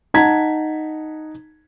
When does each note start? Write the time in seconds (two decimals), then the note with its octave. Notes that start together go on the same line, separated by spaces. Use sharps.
0.14 D#4 F#5 A5 A#5 G#6 B6